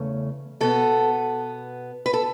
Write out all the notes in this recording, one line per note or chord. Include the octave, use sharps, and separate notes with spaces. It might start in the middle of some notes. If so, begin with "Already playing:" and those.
Already playing: E2 C#3 A3 C#4
B2 B3 A4
B4
A4